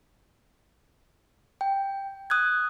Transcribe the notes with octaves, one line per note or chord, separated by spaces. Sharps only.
G5
D#6 F#6 G#6